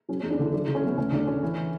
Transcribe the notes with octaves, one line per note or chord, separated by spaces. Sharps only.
F#3 C#4
C#4
E2
D4
D3 E4
F#3 D4
E4
D3
C#4
F#3 B3
D2 C#4
D2 D4
C#3 C#4
E3